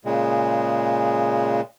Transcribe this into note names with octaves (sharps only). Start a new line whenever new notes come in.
A#2 C#3 G#3